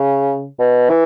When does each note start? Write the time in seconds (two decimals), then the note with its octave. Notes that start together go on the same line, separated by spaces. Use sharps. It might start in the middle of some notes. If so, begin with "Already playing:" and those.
Already playing: C#3
0.59 B2
0.90 E3